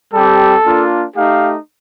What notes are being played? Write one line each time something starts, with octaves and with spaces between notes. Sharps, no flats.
G3 C4 G4 A4
A#3 D4 F4
A3 D#4 G4 F5